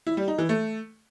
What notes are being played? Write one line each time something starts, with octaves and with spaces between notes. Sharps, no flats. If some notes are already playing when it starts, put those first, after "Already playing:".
E4
G3
D#4
E3
A3